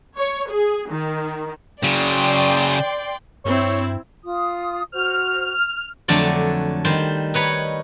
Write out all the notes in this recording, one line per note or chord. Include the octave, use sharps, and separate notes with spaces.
C#5
G#4
D#3
C#3 F#3 D5 G5 C6
G2 C4 E4 C#5
F4 D#6
F#4 C5 F6
F2 D3 F#3 A3 D5
D#3 G3 C5
D#4 B4 C#5 B5